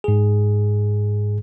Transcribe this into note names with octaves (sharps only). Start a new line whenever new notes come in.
G#2 G#4